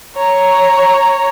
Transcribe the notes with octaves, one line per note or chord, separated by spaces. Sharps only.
C#5 A#5